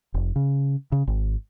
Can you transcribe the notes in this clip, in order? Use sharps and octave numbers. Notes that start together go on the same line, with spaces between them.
F1
C#3
C#3
G#1